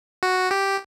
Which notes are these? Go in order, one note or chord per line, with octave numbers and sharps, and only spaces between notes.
F#4
G4